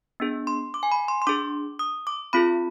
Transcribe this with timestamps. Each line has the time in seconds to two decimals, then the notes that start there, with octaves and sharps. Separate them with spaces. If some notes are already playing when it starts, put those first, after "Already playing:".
0.20 B3 D4 G#4
0.47 C6
0.74 D6
0.83 G#5
0.92 B5
1.08 C6
1.22 C6
1.27 D4 G#4 D6
1.79 D#6
2.07 D6
2.33 C4 F4 G#4 B5